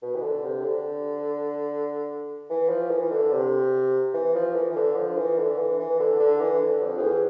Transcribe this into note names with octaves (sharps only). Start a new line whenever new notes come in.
B2
E3
D3
C3
D3
E3
F3
E3
E3
D3
C3
E3
F3
E3
E3
D3
F3
E3
D3
E3
E3
D3
D3
E3
D3
F2
F2
E2